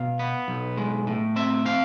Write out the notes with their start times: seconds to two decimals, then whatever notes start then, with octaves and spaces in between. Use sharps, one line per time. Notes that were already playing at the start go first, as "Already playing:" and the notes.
Already playing: B2 F5
0.19 B3
0.48 B1
0.77 G#3
1.07 A2
1.36 C4 E5
1.65 C4 F5